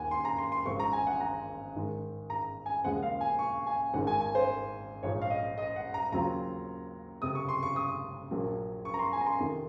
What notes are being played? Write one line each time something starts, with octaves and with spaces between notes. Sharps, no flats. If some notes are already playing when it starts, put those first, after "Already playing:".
Already playing: D#2 D#3 F#5 G#5
C6
A#5
C6
C6
G#1 G#2 F3 C4 C#6
A#5
G#5
F#5
A#5
G#2 D#3 G#3
A#5
G#5
D#2 C#3 F3 G#3 C4 F#5
F5
G#5
C#6
G#5
G#1 G#2 D#3 G#3 C4 F#5
G#5
G#5
C5
A#1 G#2 F3 C#5
F5
D#5
D#5
F#5
A#5
D#2 C#3 F#3 C4 F4 A#5
F#1 F2 C3 D#6
C#6
C6
C#6
D#6
A#1 A#2 F#3 A#3
C#6
A#5
C6
G#5
A#5
C6
F2 C3 D#3